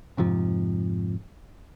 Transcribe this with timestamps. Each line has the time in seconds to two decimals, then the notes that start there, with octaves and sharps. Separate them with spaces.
0.17 F2 G#2 C3 F3